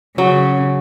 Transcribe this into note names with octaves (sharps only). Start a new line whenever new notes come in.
C#3 F#3